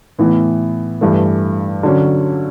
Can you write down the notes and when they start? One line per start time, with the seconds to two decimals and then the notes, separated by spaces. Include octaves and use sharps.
0.19 A2 E3 B3 E4
1.01 G2 E3 A3
1.83 D3 F#3 C#4